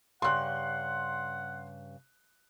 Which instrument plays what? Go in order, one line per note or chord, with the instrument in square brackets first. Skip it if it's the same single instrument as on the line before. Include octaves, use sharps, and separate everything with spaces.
[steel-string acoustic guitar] G2 C#3 [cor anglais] F#5 [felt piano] C6 F#6